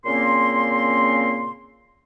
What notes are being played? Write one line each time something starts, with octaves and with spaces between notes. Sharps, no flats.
A#2 C#3 A#3 C4 C#4 C6